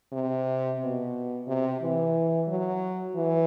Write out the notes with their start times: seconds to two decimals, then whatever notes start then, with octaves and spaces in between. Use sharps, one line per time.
0.12 C3
0.81 B2
1.48 C3
1.81 E3
2.48 F#3
3.16 E3